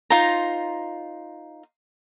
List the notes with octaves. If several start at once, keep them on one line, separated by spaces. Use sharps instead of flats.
D#4 F4 C5 A#5